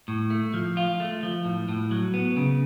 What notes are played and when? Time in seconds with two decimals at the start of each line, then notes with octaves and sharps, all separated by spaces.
0.08 A2
0.30 A3
0.54 F3
0.77 F4
1.00 A3
1.23 F3
1.45 A2
1.69 A2
1.91 F#3
2.14 B3
2.36 C#3